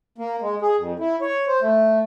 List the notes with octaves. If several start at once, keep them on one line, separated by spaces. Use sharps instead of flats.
A#3
G#3
G#4
F2
E4
C#5
C5
A3